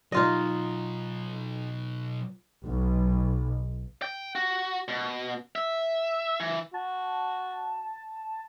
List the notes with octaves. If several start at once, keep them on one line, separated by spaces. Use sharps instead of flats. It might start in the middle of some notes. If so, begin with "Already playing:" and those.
B2 F#3 D#4 F4 D#5
B1
G5
F#4
B2
E5
E3
F#4 A5